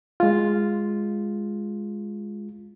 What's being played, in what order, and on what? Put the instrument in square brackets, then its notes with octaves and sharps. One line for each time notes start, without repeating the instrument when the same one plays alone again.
[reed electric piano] G#3 F4